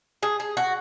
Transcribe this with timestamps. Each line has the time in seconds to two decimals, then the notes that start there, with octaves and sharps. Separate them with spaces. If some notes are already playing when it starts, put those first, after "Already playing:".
0.23 G#4
0.40 G#4
0.57 F#4